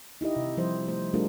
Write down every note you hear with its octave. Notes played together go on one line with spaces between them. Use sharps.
D#4 E4 G4 D#5
C3
F3 G3 C5
A3 C5
G3 A3 D4 F4 G#4 A#4